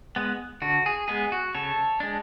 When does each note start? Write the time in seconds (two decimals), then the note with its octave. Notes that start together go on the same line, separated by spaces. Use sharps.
0.16 G#3 B3
0.62 D3 F#4
0.86 G#4
1.08 G#3 B3 G#4
1.32 F#4
1.55 C#3 A4 C#5
2.00 G#3 D4